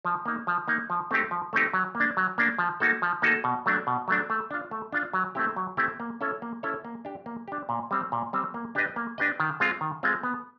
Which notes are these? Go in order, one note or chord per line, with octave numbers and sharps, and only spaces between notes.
F3
A#3 D#4
F3
A#3 D#4
F3
A3 C4 D#4 G4
F3
A3 C4 D#4 G4
F#3
A#3
D4
F#3
A#3 D4
F3
A#3 D#4 F#4 A4
F3
A#3 D#4 F#4 A4
B2
F#3 A3 D4
B2
F#3 A3 D4
A3
D4 F4
A3
D4 F4
F#3
A3 C4 E4 G4
F#3
A3 C4 E4 G4
A#3
C#4 E4 A4 C#5
A#3
C#4 E4 A4 C#5
A#3
D4 G4
A#3
D4 G4
A#2
G3 C4
A#2
G3 C4
A#3
D4 G4 B4 D#5
A#3
D4 G4 B4 D#5
D#3
G#3 C4 F4
D#3
G#3 C4 F4
B3